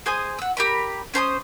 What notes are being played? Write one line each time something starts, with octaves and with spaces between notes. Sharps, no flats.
G#4 C5 G#5 D#6
F#5 E6
G4 A#4 B5
C#4 C5 A#5 D#6